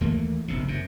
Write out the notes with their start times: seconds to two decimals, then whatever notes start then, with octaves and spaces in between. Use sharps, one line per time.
0.01 D#2 E3 A3 A#3
0.48 F#1 B1 C3
0.68 F#2 C3